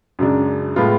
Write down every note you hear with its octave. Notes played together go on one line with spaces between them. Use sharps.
F#2 C#3 G#3 D4
A2 G#3 B3 F4